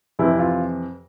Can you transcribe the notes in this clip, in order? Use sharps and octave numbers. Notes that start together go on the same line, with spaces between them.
F2 C3 E3 E4
F4